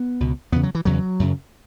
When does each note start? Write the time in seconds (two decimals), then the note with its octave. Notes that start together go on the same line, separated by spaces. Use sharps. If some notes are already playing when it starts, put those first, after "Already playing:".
Already playing: B3
0.20 C#2 B2
0.52 E2 B3
0.56 C#3
0.63 F#3
0.75 E3
0.85 E2 C#3 F#3
1.20 F#2 C#3